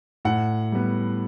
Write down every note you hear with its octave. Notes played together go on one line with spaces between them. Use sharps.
A2 F#5
G3 B3